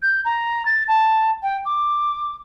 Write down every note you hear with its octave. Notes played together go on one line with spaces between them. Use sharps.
G6
A#5
A6
A5
G5
D6